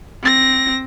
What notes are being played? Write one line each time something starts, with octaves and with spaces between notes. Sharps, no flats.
C4 A#6